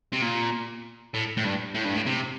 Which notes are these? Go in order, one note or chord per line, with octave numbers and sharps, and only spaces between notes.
C3
A#2
A2
A2
G2
A2
G2
A2
C3